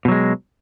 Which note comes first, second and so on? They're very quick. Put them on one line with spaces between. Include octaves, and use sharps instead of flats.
B2 F#3 G#3